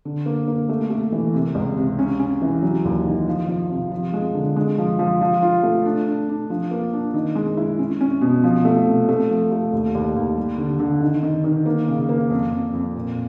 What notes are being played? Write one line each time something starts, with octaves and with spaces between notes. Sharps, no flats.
D3
A#3
A#3
A3
A3
E3
C3
C#2
C3
C#4
C#4
E3
F#3
D#2
D#3
F3
F3
C3
F3
G#3
D3
G#3
F3
F3
F3
F4
A3
D4
D4
D4
F3
A#3
D4
D#3
G#3
E4
C#4
C#4
B2
F3
A3
C3
A3
F3
A3
D#2
D#2
D#2
G3
D3
D3
D#3
D#3
D#3
A#3
C#3
A#3
F2
F2
F2
A#2